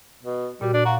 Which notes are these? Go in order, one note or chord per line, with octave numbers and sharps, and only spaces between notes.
B2
A#2 G3 F#4
D4
F#4 F5 F#5 A#5